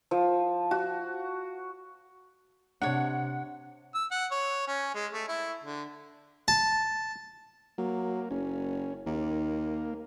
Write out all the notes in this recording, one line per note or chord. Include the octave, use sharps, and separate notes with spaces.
F3
F#4
C3 D4 C#5 F#5
E6
F#5
C#5
C#4
G#3
A3
E4
D3
A5
F#3 A#3
F#1 C#4
D#2 A#3